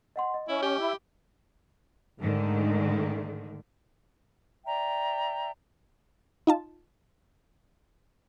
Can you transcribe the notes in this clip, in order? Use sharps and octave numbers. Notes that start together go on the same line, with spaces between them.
D#5 F#5 C6
D#5
C#4 E4
G4
E4
G#2 D3 D#3 A3
D5 E5 G5 A#5
D#4 F4 A5